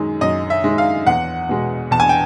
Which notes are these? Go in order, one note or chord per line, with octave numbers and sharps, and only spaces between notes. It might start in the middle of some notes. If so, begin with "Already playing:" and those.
Already playing: F#2 D#3 G#3
F#2 D#5
E5
D#3 G#3
F5
E2 F#5
B2 G#3
E2 A5
G#5
G5